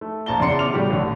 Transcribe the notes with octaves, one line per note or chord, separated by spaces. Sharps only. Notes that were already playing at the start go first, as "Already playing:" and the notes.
A3
A#1 A#2 A5 A#5 G7
E2 C#3 D5 C6 C#7
E2 D6 F6 F7
A2 C#3 G3 F#4 G4
A1 D3